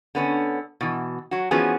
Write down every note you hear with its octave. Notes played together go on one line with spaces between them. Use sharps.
D3 B3 C#4
B2 E3
F#3 F#4
E3 F3 B3 C#4 F#4 G#4